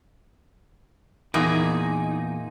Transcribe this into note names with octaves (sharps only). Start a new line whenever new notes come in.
E2 A#2 A#3 D#4 G#4